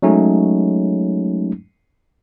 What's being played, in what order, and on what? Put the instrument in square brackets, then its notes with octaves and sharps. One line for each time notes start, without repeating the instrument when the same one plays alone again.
[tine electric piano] F#3 G#3 A3 C#4 D#4